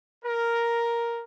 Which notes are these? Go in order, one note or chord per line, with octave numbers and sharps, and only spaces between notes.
A#4